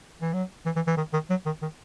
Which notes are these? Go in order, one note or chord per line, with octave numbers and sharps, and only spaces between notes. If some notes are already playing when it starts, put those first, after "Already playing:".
E3
F#3
E3
E3
E3
D#3
D#3
F#3
D#3
D#3